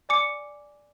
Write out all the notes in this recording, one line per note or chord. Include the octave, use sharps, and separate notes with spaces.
D5 G#5 D6 C#7